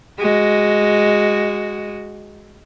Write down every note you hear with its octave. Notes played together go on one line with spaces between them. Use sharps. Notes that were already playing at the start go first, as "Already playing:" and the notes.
G#3 F#4